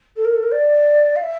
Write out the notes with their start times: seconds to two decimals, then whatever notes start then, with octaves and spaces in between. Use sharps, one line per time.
0.16 A4
0.24 A#4
0.34 A4
0.42 A#4
0.51 D5
1.15 F5
1.22 E5